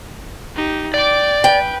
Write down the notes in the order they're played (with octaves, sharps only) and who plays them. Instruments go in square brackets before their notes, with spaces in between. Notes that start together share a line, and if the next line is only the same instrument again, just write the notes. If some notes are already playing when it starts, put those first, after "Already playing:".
[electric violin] D#4 G4
[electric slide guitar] D5 [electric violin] G5 D6
[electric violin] B4 [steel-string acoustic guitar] G5